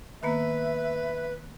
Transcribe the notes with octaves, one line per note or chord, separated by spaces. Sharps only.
D#3 A#3 B3 B4 E5